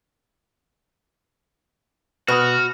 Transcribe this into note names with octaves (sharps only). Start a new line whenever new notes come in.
B2 F#4 B4 B5 D#6 F6